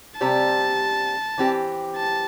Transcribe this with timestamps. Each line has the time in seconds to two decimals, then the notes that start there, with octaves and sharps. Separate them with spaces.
0.20 C3 G3 C4 G4 C5 A5
1.38 E3 C4 G4
1.97 A5